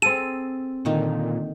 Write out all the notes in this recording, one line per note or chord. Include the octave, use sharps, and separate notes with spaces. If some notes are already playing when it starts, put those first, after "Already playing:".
C4 G#4 A4 D#7
A#2 D3 D#3 D#4